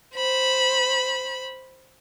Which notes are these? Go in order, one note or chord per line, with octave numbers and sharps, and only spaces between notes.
C5 B5